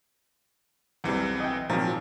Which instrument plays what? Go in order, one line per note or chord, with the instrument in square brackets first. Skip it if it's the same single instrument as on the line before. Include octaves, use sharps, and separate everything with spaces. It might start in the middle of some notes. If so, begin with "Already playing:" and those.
[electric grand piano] B1 E3 C4 [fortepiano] E2 G3
[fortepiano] D#5 G5
[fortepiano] G#1 A#2 [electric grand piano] F3 F#3